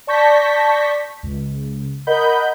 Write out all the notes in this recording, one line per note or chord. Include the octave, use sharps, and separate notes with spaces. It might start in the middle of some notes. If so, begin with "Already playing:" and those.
D5 A5 C#6 G6 A#6 B6
C#2
A#4 D#5 F#5 B5 G6